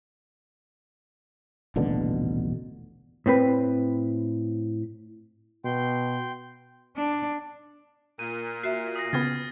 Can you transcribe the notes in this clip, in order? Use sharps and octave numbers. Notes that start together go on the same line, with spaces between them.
D#1 A1 B2 D3
A2 C4 B4
B2 G5 C6
D4
A#2 D#7
F#4 E5 C7
D#6 A#6
C#3 B3 F6 G#6 A6